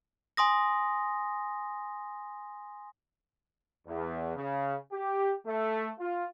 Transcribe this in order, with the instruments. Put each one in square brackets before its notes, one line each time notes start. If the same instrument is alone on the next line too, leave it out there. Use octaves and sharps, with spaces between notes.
[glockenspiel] G#5 C6 D#6 A#6
[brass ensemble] E2
C#3
G4
A3
F4